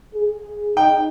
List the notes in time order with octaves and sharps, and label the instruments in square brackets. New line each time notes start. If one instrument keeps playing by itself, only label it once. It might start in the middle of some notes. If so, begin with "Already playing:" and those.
[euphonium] G#4
[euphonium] D#4 [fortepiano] G5